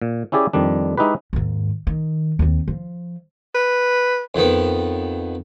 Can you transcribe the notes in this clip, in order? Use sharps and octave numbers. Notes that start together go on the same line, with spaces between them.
A#2
C#4 E4 G4 G#4 D5
F2 D#3 G3 D4
G#3 D#4 E4 G4 B4
D#2 G#2
D#3
D#2 C4
F3
B4
F2 D#3 B3